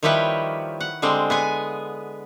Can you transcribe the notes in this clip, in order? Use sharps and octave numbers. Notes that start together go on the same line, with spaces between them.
D#3 F3 G3 E4 B4 C#5
F#5
D3 G3 G#3 C4
B3 G#4 G#5